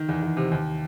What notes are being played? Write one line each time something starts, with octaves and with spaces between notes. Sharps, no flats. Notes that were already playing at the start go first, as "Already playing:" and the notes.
Already playing: D#3
E2
E2
C3
D#2